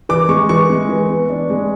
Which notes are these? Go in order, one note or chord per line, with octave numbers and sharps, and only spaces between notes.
E3 D6
G#3 C#6
E3 C#6
G#3
E3
B3
D4
G#3